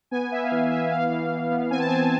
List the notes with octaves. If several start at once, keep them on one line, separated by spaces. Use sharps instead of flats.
B3 G#5
B3 E5
F5
E3 E5
B3 E5
E3 F5
E3
E3
B3
C4 G#5
A5
C4 G#5